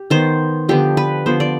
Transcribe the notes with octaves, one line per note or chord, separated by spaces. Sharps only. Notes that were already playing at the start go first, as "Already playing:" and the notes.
Already playing: G4
D#3 B3 C5
D3 F3 B3 G4
B4
D3 F3 B3 C5
D5